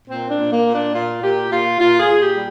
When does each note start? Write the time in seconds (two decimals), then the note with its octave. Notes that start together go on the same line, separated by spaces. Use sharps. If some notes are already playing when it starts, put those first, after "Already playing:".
0.08 A#2 C4
0.29 D4
0.37 A#2
0.51 A#3
0.65 A#2
0.72 D4
0.93 A#2 F4
1.22 A#2 G4
1.50 A#2 F4
1.78 A#2 F4
1.99 G#4
2.06 A#2
2.20 G4
2.35 G3